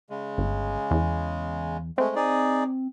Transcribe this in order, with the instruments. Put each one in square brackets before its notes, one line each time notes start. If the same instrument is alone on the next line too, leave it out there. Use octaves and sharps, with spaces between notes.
[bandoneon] C#3 G#3
[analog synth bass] G1
E2
[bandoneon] G#3 A3 [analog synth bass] C4
[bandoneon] D#4 G#4 D5